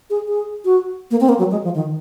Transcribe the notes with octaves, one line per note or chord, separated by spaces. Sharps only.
G#4
G#4
F#4
A#3
C4
A#3
F#3
G#3
F3
D#3